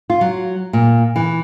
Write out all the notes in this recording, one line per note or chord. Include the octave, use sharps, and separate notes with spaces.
F4
F#3
A#2
E3